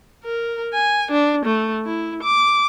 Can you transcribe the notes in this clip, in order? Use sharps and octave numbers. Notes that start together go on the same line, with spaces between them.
A#4
G#5
D4
A3
E4
D6